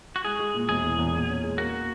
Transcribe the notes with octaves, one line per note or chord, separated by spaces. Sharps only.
F#4
G#3 G#4
G#3
A#2
E1 G#4
E2
E2
A#2
C#4
G#3
A#3 F#4